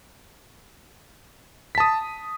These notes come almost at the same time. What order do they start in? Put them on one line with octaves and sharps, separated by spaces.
B6 A5 D#6